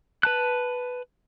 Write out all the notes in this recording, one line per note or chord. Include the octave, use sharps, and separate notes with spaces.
B4 A5 F#6